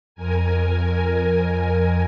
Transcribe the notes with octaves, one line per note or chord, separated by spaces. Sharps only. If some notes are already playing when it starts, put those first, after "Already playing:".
F2 A#4 G#5